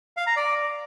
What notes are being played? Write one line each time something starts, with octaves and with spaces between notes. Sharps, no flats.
F5
A#5
D5